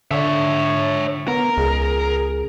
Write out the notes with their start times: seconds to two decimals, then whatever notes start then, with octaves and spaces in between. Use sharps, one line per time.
0.11 D3 C#5 E5
1.28 B3 A#4
1.57 C#2 G#4